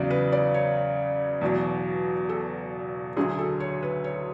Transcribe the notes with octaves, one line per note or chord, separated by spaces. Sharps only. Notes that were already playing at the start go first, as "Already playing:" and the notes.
Already playing: E2 C#3 F#3 D5
B4
D5
C#5
E2 B2 F#3
A4
D2 D3 F#3 G#4
A4
C#5
B4
C#5